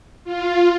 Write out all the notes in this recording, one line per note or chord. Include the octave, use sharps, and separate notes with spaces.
F4